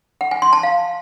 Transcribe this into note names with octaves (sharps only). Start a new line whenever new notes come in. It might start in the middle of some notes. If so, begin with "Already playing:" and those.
F#5
G#5
C6
A5
F5